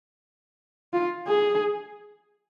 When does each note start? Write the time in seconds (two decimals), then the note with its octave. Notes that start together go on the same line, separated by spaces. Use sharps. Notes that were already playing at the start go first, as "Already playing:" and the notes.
0.93 F4
1.27 G#4